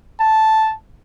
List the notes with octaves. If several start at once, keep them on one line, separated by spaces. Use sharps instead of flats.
A5